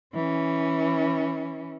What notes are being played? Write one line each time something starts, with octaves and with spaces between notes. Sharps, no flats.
E3 C#4